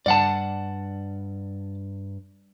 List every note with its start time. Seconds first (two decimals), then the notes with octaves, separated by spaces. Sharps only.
0.06 G2 D5 F#5 A5